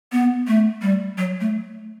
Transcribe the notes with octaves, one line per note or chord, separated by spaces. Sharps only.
B3
A3
G3
F#3
A3